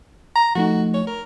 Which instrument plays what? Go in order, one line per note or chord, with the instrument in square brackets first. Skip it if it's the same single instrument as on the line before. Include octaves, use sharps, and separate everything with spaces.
[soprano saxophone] A#5
[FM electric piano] F3 A3 D#4 [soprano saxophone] F#4
[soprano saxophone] C#5
A#4